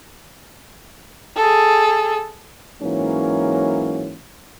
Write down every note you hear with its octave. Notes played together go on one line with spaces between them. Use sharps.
G#4 A4
G#2 E3 F#3 A#3 C#4